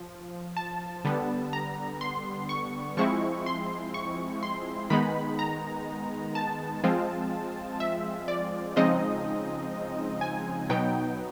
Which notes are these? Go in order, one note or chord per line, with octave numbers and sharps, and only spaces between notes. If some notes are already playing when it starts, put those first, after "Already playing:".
Already playing: F3
A5
D3 G3 B3
A#5
C6
C#6
F3 G#3 C4 E4 C#6
C6
C#6
C6
D#3 G#3 B3 D#4 B5
A#5
A5
F3 G#3 C4 F4
E5
D5
C#3 F3 G#3 C4 D#4 D#5
G#5
B2 F#3 B3 D#4 G5